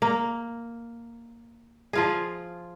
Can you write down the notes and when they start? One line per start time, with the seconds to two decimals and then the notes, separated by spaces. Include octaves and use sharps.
0.02 A#3
1.93 F3 F4 G#4